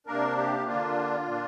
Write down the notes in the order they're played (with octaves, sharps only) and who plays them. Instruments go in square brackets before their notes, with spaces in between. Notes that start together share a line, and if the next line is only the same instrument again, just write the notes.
[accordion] C3 A#3 D4 A#4
G4
D3 A#3 D4 F4
A#2 A#3 D4